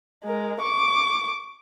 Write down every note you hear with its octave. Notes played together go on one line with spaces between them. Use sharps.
G#3 A#4
C#6 D6